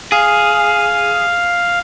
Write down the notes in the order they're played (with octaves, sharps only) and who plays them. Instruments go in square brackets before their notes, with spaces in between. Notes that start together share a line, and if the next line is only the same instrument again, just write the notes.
[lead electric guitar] G#4 [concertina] F5